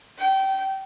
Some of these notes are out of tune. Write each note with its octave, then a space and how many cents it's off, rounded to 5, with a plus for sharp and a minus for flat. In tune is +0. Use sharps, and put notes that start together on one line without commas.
G5 -25